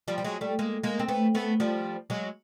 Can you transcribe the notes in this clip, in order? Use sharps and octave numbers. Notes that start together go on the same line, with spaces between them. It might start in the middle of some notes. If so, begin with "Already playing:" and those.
F3 G3
G3
F#3 G#3
G3 A3
G#3 A#3
G#3 A#3
C4
A3 B3
A3 B3
F3 G3
F#3 G#3